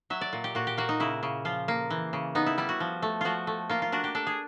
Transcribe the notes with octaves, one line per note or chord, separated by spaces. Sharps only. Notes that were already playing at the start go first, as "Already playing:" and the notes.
F#3 E5
D5
A#2
G4
A#2 F#4
G4
A#3 F#4
D#4
C#3 E4
C#3
F3 F4
A#3
E3
C#3
B3 D#4
E4
G3 E4
F#4
F3
A3
F3 F4 F#4
A3
A#3 F4
F4
D4 F#4
G4
D4 A4
G#4